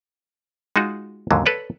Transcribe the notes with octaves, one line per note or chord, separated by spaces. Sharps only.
G#3 D#4 F4 F#4
D#2 G#2 D3 F#3
A4 B4 C#5 D5